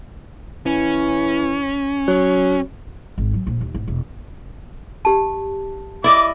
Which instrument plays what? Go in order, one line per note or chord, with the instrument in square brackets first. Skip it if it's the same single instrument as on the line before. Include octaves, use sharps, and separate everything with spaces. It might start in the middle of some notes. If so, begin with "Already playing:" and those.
[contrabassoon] E3 [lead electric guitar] C#4
[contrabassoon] F#3
[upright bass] G#1
F#3
A#1
D#2
G#1
E1
[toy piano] G4 A5
[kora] E4 D5 D#5 [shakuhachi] D6